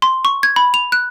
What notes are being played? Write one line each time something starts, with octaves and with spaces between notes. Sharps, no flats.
C6
C#6
G#6
B5
F7
F#6